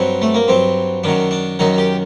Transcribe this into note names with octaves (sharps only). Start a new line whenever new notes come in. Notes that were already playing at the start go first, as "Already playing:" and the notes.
Already playing: G2 F#3 C4
A3
A#3
G2 F#3 C4
F#2 D#3 F#3 D4
D4
F#2 D#3 F#3 D#4
G4